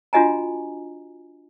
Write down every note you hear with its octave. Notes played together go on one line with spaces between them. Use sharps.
D4 F4 F#4 D#5 G#5 A#5